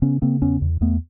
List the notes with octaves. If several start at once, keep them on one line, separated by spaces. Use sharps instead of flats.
C#3 B3 C#4
C#3 A#3 C4
E2 B3 C#4
E2
E2 A3 B3